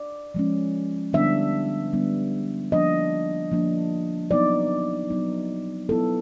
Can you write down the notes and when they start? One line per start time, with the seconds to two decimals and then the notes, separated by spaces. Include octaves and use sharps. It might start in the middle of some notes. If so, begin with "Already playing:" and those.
Already playing: D5
0.34 F3 G#3 C#4
1.13 D3 G3 B3 D4 E5
1.93 D3 G3 B3 D4
2.72 F3 A#3 D4 D#5
3.51 F3 A#3 D4
4.31 F#3 B3 D#4 D5
5.10 F#3 B3 D#4
5.89 F#3 B3 E4 A4